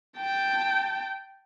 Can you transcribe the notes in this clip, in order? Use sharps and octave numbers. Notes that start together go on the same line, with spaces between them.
G5 A5